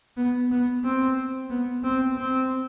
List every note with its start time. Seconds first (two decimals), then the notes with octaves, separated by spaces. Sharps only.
0.17 B3
0.51 B3
0.84 C4
1.50 B3
1.83 C4
2.17 C4